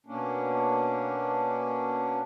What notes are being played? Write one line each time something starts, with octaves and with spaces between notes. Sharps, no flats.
B2 A#3 C#4 D4